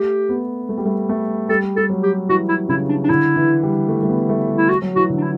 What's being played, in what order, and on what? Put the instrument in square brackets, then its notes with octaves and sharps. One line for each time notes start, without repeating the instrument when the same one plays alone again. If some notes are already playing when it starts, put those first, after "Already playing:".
Already playing: [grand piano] A3 [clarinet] G4
[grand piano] B3
A3
G3
A3
A3
[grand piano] G3 [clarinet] A4
[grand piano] G3 [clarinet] A4
[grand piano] F#3
[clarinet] G4
[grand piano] E3 [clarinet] F#4
[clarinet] E4
[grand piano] C#3 [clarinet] E4
[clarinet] D4
D4
[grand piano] D3 [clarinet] E4
[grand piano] E3
G3
A3
A3
B3
A3
G3
[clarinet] E4
F#4
[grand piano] F#3
[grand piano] E3 [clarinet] F#4
[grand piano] D3
[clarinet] D4
E4